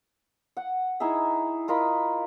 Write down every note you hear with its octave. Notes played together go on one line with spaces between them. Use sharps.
F#5
D#4 E4 G#4 E5
F4 A#4 D#5 B5